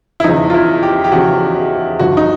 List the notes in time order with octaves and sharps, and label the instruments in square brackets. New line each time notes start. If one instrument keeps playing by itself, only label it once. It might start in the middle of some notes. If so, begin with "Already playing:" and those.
[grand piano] E4
[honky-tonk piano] E2 C#3 F3 [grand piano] D#4
[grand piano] F4
E4
G4
G4
[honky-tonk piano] E2 C#3 F3 [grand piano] F#4
[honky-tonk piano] G2 D3 F3 [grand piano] F#4
[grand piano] D#4